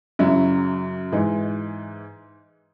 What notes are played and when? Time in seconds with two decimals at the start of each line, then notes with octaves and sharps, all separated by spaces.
0.19 F#2 C#3 F#3 E4
1.12 G#2 E3 D#4